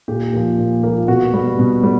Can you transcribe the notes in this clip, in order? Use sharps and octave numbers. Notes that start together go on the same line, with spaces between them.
A#2 G4
F3 A#3
A#2
F3 A#3
B2 F#4
G3 B3
B2
G3